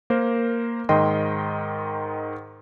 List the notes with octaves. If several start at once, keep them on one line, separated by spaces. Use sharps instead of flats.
A#3 A#4 C5
G#2 D#3 D#5 G5 C6